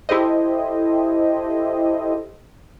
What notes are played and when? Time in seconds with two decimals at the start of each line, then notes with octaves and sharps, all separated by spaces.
0.09 E4 G4 A4 C5 D#5